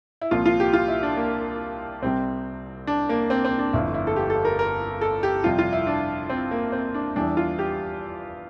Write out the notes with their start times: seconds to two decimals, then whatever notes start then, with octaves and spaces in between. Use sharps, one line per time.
0.22 E4
0.31 C2 A#2 F3 F4
0.45 F4
0.60 G4
0.73 F4
0.88 E4
1.03 D4
1.17 A#3
2.02 C2 C3 G3 C4
2.87 D4
3.09 A#3
3.30 C4
3.45 C4
3.59 D4
3.73 G1 F2 D3 A3 E4
3.94 E4
4.07 A4
4.16 G4
4.30 A4
4.45 A#4
4.59 A#4
5.01 A4
5.23 G4
5.44 F2 C3 G3 F4
5.59 F4
5.73 E4
5.87 D4
6.30 C4
6.51 A#3
6.72 C4
6.94 D4
7.16 E2 E3 G3 D4
7.37 F4
7.59 G4